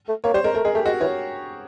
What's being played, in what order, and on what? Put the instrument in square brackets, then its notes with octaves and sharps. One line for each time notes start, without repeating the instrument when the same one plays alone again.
[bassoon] A3
[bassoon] A#3 [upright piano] C#5
[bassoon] G3 [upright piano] C5
[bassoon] G#3 [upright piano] A#4
[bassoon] A3 [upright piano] A#4
[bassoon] G#3 [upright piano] G#4
[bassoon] A3 [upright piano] G4
[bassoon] G#3 [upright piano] F#4
[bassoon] E3 [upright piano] C#5